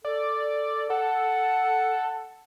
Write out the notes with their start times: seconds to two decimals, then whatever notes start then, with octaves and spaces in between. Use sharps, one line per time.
0.05 A4 D5
0.90 A4 F#5